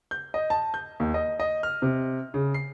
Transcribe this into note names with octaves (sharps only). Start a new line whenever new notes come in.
G6
D#5
A5
G6
D#2
D#5
D#5
F6
C3
C#3
C7